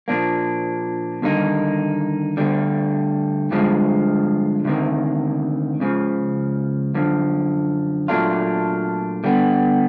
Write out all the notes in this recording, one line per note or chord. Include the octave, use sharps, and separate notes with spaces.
A#2 F3 A#3 D4
D#2 D3 G3 A#3 D#4
D2 D3 G3
G2 D3 F3 G#3
D2 C3 D#3
C#2 C#3 F3
F#2 D3 F3
A#2 F#3 A3 D4 F4
D3 G3 B3